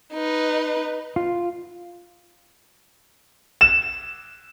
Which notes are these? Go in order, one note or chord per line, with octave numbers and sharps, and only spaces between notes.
D#4 B4
F4
E7